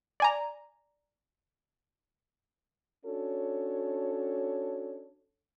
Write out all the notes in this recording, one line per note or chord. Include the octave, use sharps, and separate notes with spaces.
D5 G#5 A#5
C#4 D4 F#4 A4 C#5